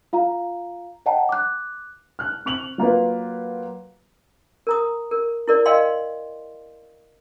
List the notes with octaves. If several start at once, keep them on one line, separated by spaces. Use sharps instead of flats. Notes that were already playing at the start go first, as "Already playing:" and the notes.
F4 F5 A#5
C#5 D#5 F#5 G5 A5 A#5
D6 F#6
F6 F#6
C4 C#6 F7 F#7
F#3 A#3 F4 B4
A#4 A#5 D#6
A#4
E4 A#4 D5
A#4 D#5 F5 G5 C6